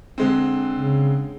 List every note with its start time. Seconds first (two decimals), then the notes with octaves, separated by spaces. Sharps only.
0.18 D3 G#3 C4
0.75 C#3